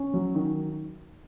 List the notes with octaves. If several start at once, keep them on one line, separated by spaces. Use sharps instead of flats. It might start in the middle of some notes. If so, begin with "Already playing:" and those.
Already playing: C#4
F#3
D#3